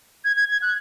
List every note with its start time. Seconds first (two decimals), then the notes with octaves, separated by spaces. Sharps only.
0.25 G#6
0.36 G#6
0.49 G#6
0.62 F#6